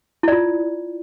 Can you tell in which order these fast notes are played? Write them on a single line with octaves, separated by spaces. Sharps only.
E4 D5 F4